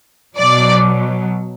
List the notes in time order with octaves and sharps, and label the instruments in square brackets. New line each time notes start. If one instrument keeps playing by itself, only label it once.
[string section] B2 F#3 D5